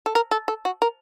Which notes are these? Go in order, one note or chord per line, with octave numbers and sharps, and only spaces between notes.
A4
A#4
A4
A4
F#4
A#4